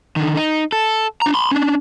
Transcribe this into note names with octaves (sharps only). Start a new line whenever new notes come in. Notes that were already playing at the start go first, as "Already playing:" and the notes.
D3 D#3
D#4
A4
D4 A#5
B5 C6
C#4 D4